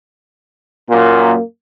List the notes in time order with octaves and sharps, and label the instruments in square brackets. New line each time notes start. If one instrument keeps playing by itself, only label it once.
[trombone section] F#2 A#2 [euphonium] A#3